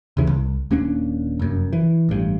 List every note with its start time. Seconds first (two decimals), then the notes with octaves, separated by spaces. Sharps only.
0.17 D#1 C#2 C#3 E3
0.29 C2
0.71 D#1 A#3 C#4 D4
1.39 F1 F#2
1.73 E3
2.09 A1 G2